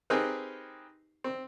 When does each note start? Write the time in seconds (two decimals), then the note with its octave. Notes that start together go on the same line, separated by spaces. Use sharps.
0.10 C4 D#4 G4 G#4 A#4 B4
1.24 C4